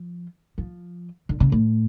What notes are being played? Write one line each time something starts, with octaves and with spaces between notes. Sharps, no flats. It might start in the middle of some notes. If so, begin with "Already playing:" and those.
Already playing: F3
F3
D3
C#3
A2